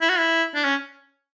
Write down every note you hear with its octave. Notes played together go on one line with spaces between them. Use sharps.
E4
F#4
E4
D4
C#4